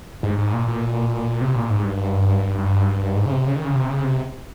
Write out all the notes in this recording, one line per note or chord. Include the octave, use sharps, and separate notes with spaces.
G#2
G#2
A#2
A#2
C3
A#2
G#2
G2
G2
G#2
C#3
C3
C#3
D#3
C#3
C3
C#3
C3